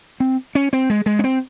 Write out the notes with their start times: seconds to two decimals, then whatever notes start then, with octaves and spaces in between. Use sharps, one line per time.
0.20 C4
0.55 C#4
0.73 C4
0.90 G#3
1.06 G#3
1.19 C#4
1.24 C4